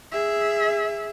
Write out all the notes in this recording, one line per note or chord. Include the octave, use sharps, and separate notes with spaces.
G#4 E5